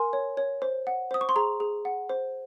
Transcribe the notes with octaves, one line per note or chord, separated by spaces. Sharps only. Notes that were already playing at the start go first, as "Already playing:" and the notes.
Already playing: A#4 G#5 C6
C#5
C#5
C5
F#5
C5 D#6
C#6
C6
G#4 A#5
G#4
F#5
C5